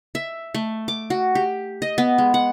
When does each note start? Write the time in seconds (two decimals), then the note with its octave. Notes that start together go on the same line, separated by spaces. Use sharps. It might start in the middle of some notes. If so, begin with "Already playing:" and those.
0.15 E5
0.54 A3
0.88 D6
1.10 F#4
1.35 G4
1.82 D#5
1.98 B3
2.18 G#3
2.34 F#5